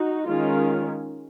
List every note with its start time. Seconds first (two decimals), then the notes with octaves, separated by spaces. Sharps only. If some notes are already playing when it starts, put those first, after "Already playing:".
Already playing: D#4 F#4
0.27 D#3 G#3 C#4 F4